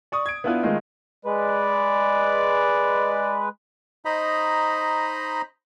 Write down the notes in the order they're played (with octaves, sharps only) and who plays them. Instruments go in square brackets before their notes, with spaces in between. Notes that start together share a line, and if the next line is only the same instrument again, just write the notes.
[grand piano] D5 C#6 D#6
G#6 D7
B3 D4 E4 F4 B4
D#3 G#3 A3 D#4 F4
[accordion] G#3 B4 [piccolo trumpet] D5
[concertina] D#4 C5 D#5 A#5 B5